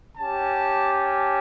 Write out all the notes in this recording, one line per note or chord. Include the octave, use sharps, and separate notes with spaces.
C#4 G4 A5
A5